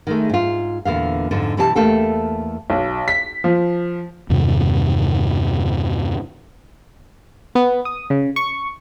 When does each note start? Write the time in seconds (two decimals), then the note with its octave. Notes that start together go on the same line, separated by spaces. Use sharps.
0.07 D#3 G#3 A3
0.29 G#2 F4
0.85 E2 A#2 D3 F5
1.31 F2 G#2 D3
1.57 B2 E3 G4 C5 A5
1.76 E2 A3 A#3 A4 F5 G5
2.70 B1
3.08 B6
3.44 F3
4.30 E2 G2 C3 D#3
7.55 B3
7.85 D#6
8.10 C#3
8.36 C#6